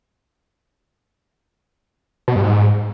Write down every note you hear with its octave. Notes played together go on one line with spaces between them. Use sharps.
B2
G2
G#2